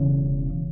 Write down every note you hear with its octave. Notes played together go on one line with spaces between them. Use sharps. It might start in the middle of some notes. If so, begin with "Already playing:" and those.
Already playing: E1 E2 C#3